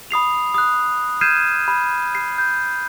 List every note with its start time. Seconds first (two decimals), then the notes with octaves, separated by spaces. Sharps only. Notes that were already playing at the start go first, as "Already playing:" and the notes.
0.11 B5 D#6 C7 F7
0.54 D#6 F#6
1.21 F6 G6 G#6 C7 D#7 E7
1.68 B5
2.15 C7
2.38 G6